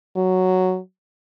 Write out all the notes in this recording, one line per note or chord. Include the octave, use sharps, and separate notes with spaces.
F#3